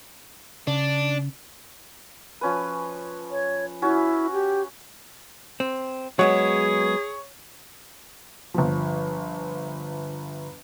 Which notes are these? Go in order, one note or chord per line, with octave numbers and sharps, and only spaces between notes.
C#3 D4
F3 C#4 B4
C#5
C#4 E4 F#4
G4
C4
F#3 G#3 B3 G#4 C#5
G1 F3